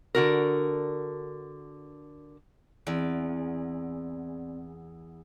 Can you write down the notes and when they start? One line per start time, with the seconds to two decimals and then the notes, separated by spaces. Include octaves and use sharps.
0.15 D3 F#4 A#4
2.87 E2 C4 D5